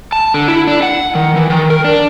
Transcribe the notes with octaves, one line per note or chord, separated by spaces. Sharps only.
A5
D3
E4
D4
F#5
D#3
E3
D#3
A#4
D4